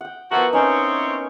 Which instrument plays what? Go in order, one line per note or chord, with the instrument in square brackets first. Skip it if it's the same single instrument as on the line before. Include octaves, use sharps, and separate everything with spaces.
[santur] F#5 G5
[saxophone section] F3 E4 F#4 [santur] B3 A#4
[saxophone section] C4 E4 C#5 [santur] C#4 D#4